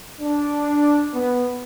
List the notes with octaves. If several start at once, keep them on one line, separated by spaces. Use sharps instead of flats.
D4
B3